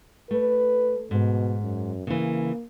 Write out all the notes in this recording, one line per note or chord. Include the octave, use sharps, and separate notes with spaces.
A3 B4
G#2 B2
F#2
C#3 E3 A#3